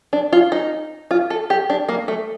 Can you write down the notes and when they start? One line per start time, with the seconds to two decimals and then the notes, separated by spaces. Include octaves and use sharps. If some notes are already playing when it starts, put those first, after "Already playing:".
0.13 D4
0.33 F4
0.52 D#4
1.11 F4
1.30 A4
1.50 G4
1.70 D4
1.89 A#3
2.08 A3